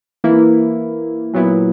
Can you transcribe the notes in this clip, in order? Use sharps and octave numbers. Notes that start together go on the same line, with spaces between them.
E3 A#3 E4
A#2 F#3 B3 E4